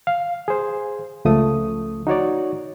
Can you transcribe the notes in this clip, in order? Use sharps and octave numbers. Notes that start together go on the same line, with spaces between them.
F5
G#4 C5
C#2 F3 A3 D#6
D#4 F#4 C#5 D5